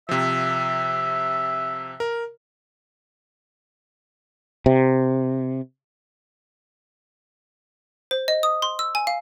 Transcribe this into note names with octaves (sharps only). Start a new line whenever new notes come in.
C3 F3 E5
A#4
C3
C5
D#5
D#6
C6
E6
G#5
F5